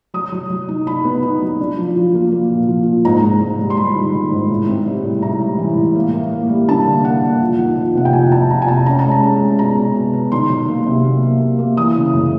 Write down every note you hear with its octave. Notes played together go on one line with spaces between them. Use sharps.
F#3 D#6
F#3
F#3
D#4
D#4 B5
B3
D#4
F#3
D4
F3
F3
A#3
A#3
A#2
F3
A#2
G#2 A#5
G#2
G#2
G3
C6
G3 B5
D#3
D#3
G#2
A2
C4
G3
A2
A2 A#5
G3
E3
A2
A#3
A#3
A#3
G3
D3 A5
A#3
A#3 F#5
A#3
F2
D#3
F2
C3 F#5
G5
F2 G#5
F2 A5
F2 A#5
G#5
C3 A5
C#4 A#5
A5
G#3
A#5
C#4
G#3
B2 A#5
B2
B2
B2
D#3 C6
F#3
A#3
C3
A#3
A#3
A#3
A#3
E3 D#6
C#3
F#2